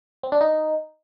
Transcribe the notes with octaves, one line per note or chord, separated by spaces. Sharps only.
C4
D4
D#4